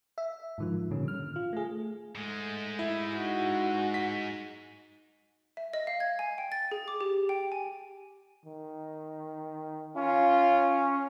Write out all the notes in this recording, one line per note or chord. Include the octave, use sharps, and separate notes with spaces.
E5
G#2 D#3 F3
A#2 D3 D#3 G3 C#4
F6
F4
A3 G#4
G#2 G#3 A3
E4
D#4 F#4
B6
E5
D#5
F5
G#6
G#5
G5
A6
G#4
D6
G4
G5
G#5
D#3
C#4 F4